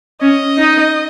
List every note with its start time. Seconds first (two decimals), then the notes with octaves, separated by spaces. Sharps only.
0.21 C#4 D#5
0.58 D#4